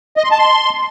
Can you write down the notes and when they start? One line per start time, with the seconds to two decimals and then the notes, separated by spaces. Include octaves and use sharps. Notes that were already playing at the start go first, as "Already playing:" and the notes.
0.17 D#5
0.24 C6
0.31 A5
0.39 C6